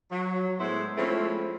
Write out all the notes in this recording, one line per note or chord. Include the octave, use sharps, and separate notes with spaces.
F#3
A2 G#3 B3 E4 C5
F3 G#3 A3 C4 C#4 E4